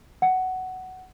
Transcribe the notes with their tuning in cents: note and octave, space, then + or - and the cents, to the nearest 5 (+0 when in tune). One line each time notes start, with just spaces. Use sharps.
F#5 +10